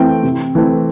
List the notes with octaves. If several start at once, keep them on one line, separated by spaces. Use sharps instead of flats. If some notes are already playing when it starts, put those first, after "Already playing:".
Already playing: E3 A3 C4 G5
C3
E3 A3 C4